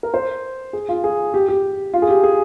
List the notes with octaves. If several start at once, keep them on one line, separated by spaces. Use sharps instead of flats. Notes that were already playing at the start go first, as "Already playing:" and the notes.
A#4
C5
G#4
F4
G#4
G4
G4
F4
G#4
G4
G#4